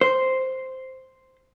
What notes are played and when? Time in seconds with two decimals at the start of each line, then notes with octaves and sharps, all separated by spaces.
0.01 C5